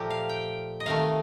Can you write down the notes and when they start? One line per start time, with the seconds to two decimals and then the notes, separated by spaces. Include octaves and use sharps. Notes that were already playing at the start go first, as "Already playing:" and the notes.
Already playing: A#2 F3 A3 A#3 G4
0.10 F5
0.29 G5
0.80 D#5
0.86 C3 D#3 A3 F5